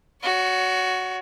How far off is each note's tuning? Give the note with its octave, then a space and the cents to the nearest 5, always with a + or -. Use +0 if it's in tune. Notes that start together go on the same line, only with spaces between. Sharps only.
F#4 +0 C#5 +35